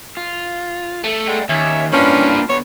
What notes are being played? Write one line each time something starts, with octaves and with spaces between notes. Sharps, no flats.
F4
A3
G#3 D5 F#5 G5
D#2 C#4 E5
F3 A#3 C#4 D4 E4 B4
D3 B3 C#5